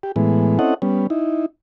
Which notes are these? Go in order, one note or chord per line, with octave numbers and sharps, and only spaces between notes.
G4
A2 E3 G#3 B3
C4 C#4 E4 A4 D#5 F#5
G3 B3 C#4
D#4 E4